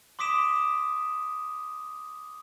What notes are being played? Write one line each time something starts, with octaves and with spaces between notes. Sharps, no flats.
C6 D6 D#6 B6 D7 E7